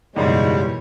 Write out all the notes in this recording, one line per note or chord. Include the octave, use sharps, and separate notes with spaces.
F#1 G#2 B2 E3 G3 G#3 C#5